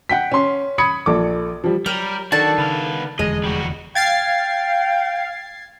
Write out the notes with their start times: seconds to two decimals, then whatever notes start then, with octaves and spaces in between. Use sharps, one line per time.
0.09 F#5 G5 B6
0.32 C#4 C6
0.78 B5 D#6 G#6 C#7
1.06 A#1 A4 D6
1.64 F3 G3
1.86 F#3 G3 A#4
2.32 D#3 D4 F#4 A4 A5
2.58 C#3 B3 F5
3.19 F1 E2 D3 G#3 D#5
3.44 G3 F#4
3.95 F5 G5 G#6 A6 C7